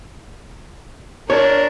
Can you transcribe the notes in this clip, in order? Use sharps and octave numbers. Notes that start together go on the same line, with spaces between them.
D4 A#4 C#5